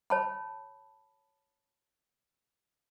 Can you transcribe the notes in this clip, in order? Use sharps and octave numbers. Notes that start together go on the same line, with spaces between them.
C#5 A5 B5